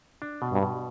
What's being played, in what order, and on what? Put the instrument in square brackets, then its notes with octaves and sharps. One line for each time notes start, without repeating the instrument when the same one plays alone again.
[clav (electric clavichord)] D4
B2
[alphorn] G2
[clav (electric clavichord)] B2